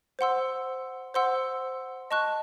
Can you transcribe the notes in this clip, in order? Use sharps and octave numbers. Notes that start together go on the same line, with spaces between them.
C5 F#5 C6 E6
C5 F#5 C6 E6
D#5 A5 C#6 F#6